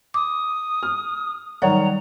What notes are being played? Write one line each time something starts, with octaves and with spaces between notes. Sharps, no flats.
D6 D#6
F6
D#3 F#3 G3 C#5 D5 F#5 A#5